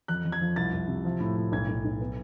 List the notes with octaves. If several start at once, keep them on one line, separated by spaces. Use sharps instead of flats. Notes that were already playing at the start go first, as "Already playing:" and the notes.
F2 F#6
F2
G#6
F3
C2 A6
C2
C3
F3
A2
A2
B1 G#6
B1
B1
B3